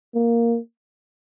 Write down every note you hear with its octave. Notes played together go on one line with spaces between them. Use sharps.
A#3